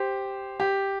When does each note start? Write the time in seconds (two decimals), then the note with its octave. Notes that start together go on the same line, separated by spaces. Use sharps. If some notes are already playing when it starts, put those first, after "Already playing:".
Already playing: G4 C5
0.60 G4